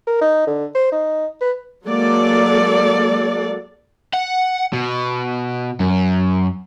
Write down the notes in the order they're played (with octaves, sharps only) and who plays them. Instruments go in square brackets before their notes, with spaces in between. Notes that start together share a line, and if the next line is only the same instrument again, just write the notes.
[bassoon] A#4
D#4
D3
C5
D#4
B4
[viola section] F#3 G#3 A#3 A4 D5
[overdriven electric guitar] F#5
B2
F#2